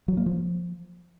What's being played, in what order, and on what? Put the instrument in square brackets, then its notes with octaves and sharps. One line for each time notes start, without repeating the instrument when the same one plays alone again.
[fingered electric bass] F#3
A#3
F3